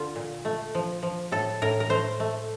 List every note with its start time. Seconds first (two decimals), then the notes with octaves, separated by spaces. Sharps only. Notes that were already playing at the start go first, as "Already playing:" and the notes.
Already playing: D3 F4
0.16 A#2
0.45 A3
0.75 F3
1.03 F3
1.32 A2 A4
1.62 A2 A#4
1.80 A#4
1.90 A3 C5
2.20 A3